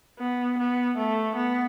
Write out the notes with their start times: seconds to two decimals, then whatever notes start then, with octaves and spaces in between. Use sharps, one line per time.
0.20 B3
0.59 B3
0.98 A3
1.37 B3